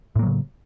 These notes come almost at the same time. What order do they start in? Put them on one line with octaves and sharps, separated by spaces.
A2 A#3 F#3 C#3